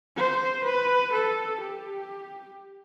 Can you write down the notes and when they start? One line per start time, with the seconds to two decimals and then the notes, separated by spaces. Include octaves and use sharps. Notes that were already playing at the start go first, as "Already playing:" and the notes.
0.17 C5
0.65 B4
1.13 A4
1.61 G4